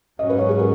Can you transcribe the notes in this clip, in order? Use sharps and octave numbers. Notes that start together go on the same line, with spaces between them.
G#2 F#3 C#4 D#5
B4
C#5
G#4
A#4